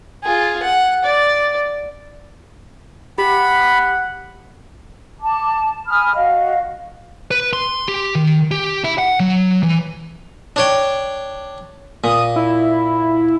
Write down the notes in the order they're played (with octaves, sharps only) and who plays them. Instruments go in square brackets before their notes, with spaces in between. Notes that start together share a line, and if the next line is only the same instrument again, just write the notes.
[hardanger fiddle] F4 G#4
F#5
D5
[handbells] G4 [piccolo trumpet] F#5 [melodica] B5
[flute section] A5 D6
G#5 B5 D#6 F6
F#4 D#5 F5
[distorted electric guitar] B4
C6
G4
D#3
G4
E4
F#5
F#3
E3
[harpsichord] D4 C#5 G5
[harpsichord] A#2 [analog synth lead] D#6
[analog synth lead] E4